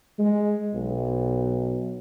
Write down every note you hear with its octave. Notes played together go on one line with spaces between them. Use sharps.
G#3
B1